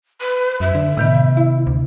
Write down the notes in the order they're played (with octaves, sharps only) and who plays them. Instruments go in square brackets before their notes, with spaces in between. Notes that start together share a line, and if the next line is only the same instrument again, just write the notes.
[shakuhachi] B4
[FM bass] F#2 [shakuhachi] E5
[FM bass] D3
[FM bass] A2 [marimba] C3 D#3 B3
[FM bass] E4
D2